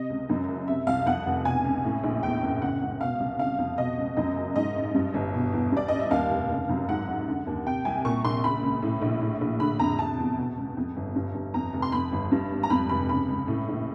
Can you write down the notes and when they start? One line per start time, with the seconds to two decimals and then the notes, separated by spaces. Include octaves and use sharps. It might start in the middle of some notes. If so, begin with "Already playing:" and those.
Already playing: C3 D#5
0.10 C#2
0.29 F#2
0.48 F#1
0.68 C3 E5
0.87 C2 F5
1.06 F2 F#5
1.26 F1
1.45 B2 G#5
1.64 C#2
1.84 A2
2.03 A#1
2.23 E2 G5
2.43 F#1
2.61 C#3 F#5
2.82 C#2
3.01 B2 F5
3.20 C2
3.39 C#3 F5
3.58 F2
3.78 B2 D#5
3.98 C#2
4.17 F#2 D#5
4.36 F#1
4.55 G#2 D#5
4.76 A1
4.95 G2
5.14 G1
5.34 B2
5.53 E2
5.72 G2 D5
5.88 A1 D#5
6.00 E5
6.11 D#2 F5
6.30 F1
6.50 C#3
6.69 F#2
6.89 G#2 F#5
7.08 A1
7.27 D3
7.47 D#2
7.66 C3 G5
7.85 C2 G#5
8.05 A#2 C#6
8.24 A#1 C6
8.44 C#3 B5
8.63 C#2
8.82 A2
9.02 A#1
9.22 A2
9.41 A#1
9.60 D3 B5
9.79 F2 A#5
9.99 C3 A5
10.18 E2
10.37 B2
10.57 C#2
10.77 F2
10.96 G1
11.16 G2
11.34 G1
11.54 F2 A#5
11.73 F1
11.82 C6
11.92 F2 B5
12.12 G1
12.32 G2
12.51 G#1
12.63 A#5
12.70 F2 B5
12.89 F1 B5
13.09 C#3 B5
13.28 C#2
13.48 A2
13.68 A#1